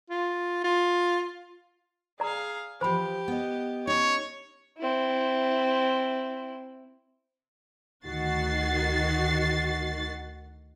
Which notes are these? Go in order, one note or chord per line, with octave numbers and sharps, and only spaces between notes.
F4
F4
G#4 D5 F5 A#5
E3 F3 G4 C5 B5
B3 D#5
C#4 D#4 C#5
C4 E4
D2 D#3 F#4 A6 C7